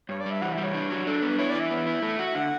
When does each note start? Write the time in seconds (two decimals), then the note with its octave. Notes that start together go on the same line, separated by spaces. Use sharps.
0.09 G2 C#5
0.20 D5
0.26 G3 E5
0.42 E3 F#5
0.53 E5
0.58 G3
0.63 C#5
0.74 D4
0.90 F#3
1.06 D4 A4
1.17 A4
1.22 B3
1.27 B4
1.38 E4 C#5
1.49 D5
1.55 E3 E5
1.71 B3
1.87 E4
2.02 A3
2.19 F#4
2.26 E5
2.35 D3 F#5